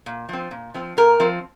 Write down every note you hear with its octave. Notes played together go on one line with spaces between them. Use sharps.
A#2
F3 C4
A#2
F3 C4
A#2 A#4
F3 C4